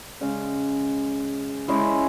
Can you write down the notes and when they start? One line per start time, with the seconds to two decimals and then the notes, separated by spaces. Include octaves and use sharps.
0.21 C#3 G#3 C#4
1.68 G#3 C#4 E4